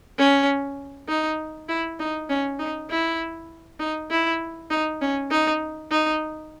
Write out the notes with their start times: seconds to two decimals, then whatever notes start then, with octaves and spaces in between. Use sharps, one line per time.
0.18 C#4
1.08 D#4
1.68 E4
2.00 D#4
2.30 C#4
2.59 D#4
2.90 E4
3.80 D#4
4.11 E4
4.70 D#4
5.01 C#4
5.31 D#4
5.91 D#4